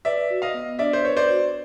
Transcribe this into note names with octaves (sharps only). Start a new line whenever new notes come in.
B4 D5 E5
F#4
D#5 F5
B3
D4 D5 E5
C5
B4 C#5
C5 D5
F#4